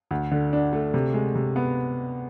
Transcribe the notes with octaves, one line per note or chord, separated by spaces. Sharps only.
D2
D3
D4
A3
C3
G#3
C3
B3